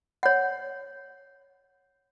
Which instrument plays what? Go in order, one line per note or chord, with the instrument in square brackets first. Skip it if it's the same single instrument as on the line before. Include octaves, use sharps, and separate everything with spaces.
[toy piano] C#5 F#5